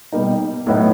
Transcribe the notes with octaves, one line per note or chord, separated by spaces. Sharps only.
B2 G3 A#3 D#4
A2 F#3 B3 D#4